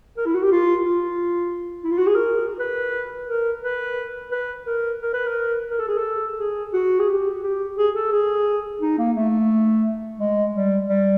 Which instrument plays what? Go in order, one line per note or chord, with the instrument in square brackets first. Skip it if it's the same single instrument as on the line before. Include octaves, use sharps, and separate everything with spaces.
[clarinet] A#4
E4
F#4
G4
F4
F4
E4
F4
F#4
G#4
A#4
B4
A#4
B4
B4
A#4
A#4
B4
A#4
A#4
A4
G#4
A4
G#4
F#4
G#4
G4
G4
G#4
A4
G#4
D#4
A#3
A3
G#3
G3
G3